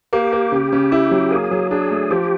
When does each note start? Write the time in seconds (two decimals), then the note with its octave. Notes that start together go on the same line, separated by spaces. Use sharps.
0.13 A#3 G4
0.32 A#3
0.52 C#3
0.73 C#3
0.92 E4
1.11 F#3
1.31 A#3 G#4
1.51 F#3
1.71 D4 G#4
1.91 A3
2.10 F3 G4